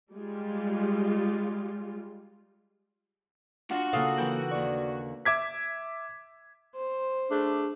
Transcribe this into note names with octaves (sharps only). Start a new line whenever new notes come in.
G3 G#3 F4
D4 F4 F#4 F#5
C#3 A#3 A4 F5 D#6
E3 A#3 E4 G5
D#2 D5 C#6
E5 D6 G#6 B6
C5
A3 D4 G#4